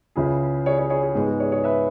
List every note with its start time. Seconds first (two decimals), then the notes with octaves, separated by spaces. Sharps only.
0.16 C#2 C#3 E3 C#4 E4 G#4
0.66 G#4 C#5
0.78 G#4 C#5
0.90 G#4 C#5
1.03 G#4
1.15 G#2 G#3 B3 G#4
1.27 G#4
1.40 G#4 C#5
1.52 G#4 C#5
1.64 B4 E5